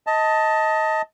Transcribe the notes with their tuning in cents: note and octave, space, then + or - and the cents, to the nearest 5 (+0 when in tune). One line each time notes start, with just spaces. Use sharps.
D#5 +20 A5 +10